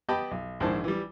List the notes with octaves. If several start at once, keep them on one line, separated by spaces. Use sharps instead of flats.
B3 G4 D#5 G5 A5 B5
B1
A#1 G#2 D#3 E4 C5 A5
E3 G3